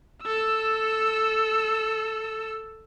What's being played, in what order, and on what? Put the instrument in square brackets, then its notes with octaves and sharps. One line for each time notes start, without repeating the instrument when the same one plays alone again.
[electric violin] A4 E6